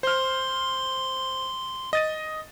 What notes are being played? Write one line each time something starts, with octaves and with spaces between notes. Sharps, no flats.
C5 C6 F6
D#5 A6 D#7